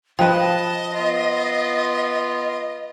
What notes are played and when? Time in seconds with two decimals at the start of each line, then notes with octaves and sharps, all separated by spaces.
0.19 F3 B4 D#5 G5 A5
0.95 B3 F4